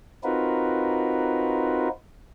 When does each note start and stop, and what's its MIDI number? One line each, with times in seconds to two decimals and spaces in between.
0.24 1.89 60
0.24 1.89 63
0.24 1.89 65
0.24 1.89 66
0.24 1.89 70
0.24 1.89 71